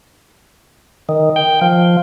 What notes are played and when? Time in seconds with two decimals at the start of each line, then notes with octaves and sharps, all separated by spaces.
1.09 D#3
1.36 G5
1.61 F3